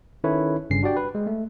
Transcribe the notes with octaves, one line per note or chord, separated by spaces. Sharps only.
D#3 C#4 E4 A4 B4 C#5
G1 G2 C#3 C#4 C7
D4 F#4 G4 D5 G5
B4
G#3
A3